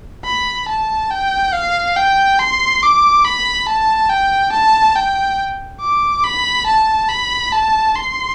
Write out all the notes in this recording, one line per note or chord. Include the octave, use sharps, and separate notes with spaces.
B5
A5
G5
F5
G5
C6
D6
B5
A5
G5
A5
G5
D6
B5
A5
B5
A5
C6